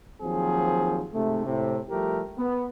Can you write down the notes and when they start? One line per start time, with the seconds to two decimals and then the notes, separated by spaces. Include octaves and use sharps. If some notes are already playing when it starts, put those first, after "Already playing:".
0.22 D#2 F3 F#3 C4 G#4
1.12 G#2 C3 A3
1.46 A2 C3
1.89 F3 G3 A3 G4 A#4
2.38 B3